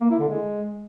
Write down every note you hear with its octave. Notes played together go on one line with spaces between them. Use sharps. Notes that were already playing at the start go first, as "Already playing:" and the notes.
A#3
E4
D3
G#3